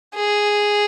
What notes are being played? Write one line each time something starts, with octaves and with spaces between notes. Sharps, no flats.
G#4